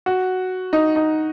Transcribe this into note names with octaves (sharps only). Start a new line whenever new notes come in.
F#4
D#4
D#4